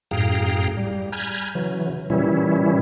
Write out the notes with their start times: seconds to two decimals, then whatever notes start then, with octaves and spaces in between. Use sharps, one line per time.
0.11 F#2 A2 G#4 F5 G5 A#5
0.77 G3
1.12 G#5 A#5 B5 F6 G6 G#6
1.55 C#3 E3 F#3
2.10 A#2 C#3 E3 G3 C#4 E4